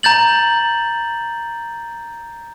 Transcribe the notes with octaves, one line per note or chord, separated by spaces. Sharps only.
A#5 G6 A6 F#7